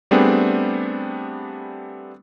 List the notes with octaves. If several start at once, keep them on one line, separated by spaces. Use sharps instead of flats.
G3 A3 B3 C4 D4 G#4